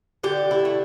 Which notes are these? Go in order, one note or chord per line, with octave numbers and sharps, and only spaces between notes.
D3 G4
E4
A3